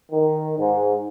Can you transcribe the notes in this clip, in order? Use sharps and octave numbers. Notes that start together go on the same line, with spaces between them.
D#3
G#2